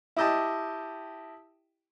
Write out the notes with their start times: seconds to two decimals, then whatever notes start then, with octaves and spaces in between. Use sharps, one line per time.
0.17 E4 G4 D#5 G5 A5